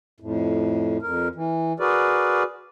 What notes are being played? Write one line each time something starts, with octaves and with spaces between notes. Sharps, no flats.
F2 A2
F2 A#4
E3
F#4 G#4 A#4 B4 D5